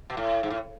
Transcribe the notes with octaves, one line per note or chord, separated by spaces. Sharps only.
B2
A2
G#2
A2